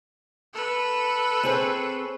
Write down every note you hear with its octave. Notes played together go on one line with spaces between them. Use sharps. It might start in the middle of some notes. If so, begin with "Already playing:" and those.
A4 B4
C4 G#4 C#5